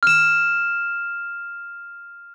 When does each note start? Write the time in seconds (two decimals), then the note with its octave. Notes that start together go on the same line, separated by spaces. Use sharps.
0.03 F6 E7